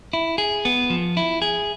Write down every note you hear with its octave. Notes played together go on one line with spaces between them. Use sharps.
E4
G#4
B3
F3
E4
G#4